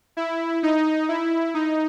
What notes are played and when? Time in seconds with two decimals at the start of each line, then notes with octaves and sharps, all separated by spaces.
0.17 E4
0.63 D#4
1.09 E4
1.54 D#4